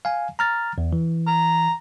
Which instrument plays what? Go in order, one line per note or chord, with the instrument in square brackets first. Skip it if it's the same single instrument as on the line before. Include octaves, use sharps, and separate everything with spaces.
[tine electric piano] F5 G#5
A#5 F6 A6
E2
E3
[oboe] A#5